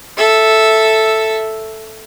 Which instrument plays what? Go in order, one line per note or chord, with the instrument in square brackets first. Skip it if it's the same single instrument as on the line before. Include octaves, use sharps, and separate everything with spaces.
[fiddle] A4 E5